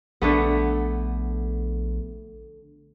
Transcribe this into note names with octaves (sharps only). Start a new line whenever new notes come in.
A#1 D3 A3 B3